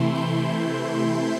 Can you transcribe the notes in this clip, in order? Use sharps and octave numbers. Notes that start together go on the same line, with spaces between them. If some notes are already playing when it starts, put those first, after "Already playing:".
Already playing: C3 E3 A3 E4 C6
G6